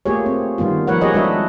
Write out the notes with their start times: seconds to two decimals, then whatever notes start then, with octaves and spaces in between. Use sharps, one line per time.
0.06 A3 A#3 F4 G4 G#4 C#5
0.26 C4
0.58 D#3 G3 B3 F4
0.87 F3 A#3 A#4 B4 C#5 F#5
1.01 G4 G#4 C#5 D#5
1.13 G3 G#3 D4 F#4 B4 E5